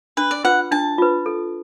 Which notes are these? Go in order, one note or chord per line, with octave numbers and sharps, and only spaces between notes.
D4 B4
D5
F4 B4 F#5
D4 A5
F4 B4
A4